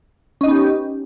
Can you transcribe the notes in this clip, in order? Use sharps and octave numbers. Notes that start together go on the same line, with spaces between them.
B3 C#4 D#4 G4 D#5